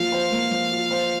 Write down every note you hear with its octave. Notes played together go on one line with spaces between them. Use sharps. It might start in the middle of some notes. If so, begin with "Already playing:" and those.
Already playing: F3 A#3 F4 F5
C5
A#3
F3
F4
C5